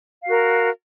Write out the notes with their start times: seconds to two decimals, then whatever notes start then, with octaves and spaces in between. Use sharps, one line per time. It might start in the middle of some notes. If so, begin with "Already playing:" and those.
0.23 F5
0.26 F#4
0.30 A#4